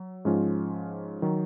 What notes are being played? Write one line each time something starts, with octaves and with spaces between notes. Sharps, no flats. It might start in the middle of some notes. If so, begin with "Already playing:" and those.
Already playing: F#3
G#2 F3 G#3 C#4 F4
D#3 F#3